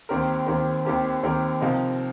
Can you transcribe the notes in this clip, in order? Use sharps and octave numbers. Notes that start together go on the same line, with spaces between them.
D#2 D#3 C4 G4 A#4
D#2 D#3 C4 G4 A#4
D#2 D#3 C4 G4 A#4
D#2 D#3 C4 G4 A#4
C3 F3 D#4 A#4